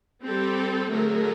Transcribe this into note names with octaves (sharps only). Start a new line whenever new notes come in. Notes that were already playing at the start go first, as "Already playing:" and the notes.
G3 C4 G4 A4
D3 F#3 A3 G#4 A#4